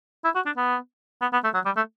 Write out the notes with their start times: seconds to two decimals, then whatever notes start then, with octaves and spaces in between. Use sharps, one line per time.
0.25 E4
0.36 F#4
0.46 D4
0.57 B3
1.22 B3
1.33 B3
1.44 A3
1.54 F#3
1.66 G3
1.76 A3